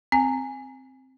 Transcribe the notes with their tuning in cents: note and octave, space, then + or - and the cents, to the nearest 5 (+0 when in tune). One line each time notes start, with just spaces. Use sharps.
C4 +0 G#5 +0